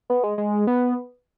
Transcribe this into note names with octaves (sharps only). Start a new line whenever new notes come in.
B3
G#3
G#3
B3